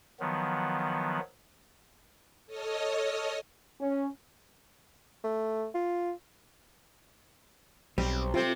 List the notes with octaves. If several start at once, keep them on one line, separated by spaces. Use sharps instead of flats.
D#3 F3 F#3 B3
A4 C#5 D#5 D#6 F6
C#4
A3
F4
B1 G3 C4
C3 C4 F4 A4 C5